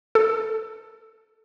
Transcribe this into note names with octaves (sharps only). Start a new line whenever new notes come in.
A4